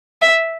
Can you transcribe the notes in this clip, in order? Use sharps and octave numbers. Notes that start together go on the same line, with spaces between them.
E5